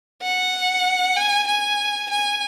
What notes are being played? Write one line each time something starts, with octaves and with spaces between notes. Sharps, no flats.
F#5
G#5
G#5
G#5